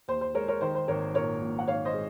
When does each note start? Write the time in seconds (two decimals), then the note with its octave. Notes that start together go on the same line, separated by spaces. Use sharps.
0.08 D#2 C5
0.21 C5
0.35 G#3 A#4 C#5
0.48 A#4 C#5
0.61 D#3 C5
0.75 C5
0.88 G#1 A#4 C#5
1.14 A#2 A#4 C#5
1.41 A#1
1.59 F#5
1.68 G#1 C#5 F5
1.85 C5 D#5
1.94 G#3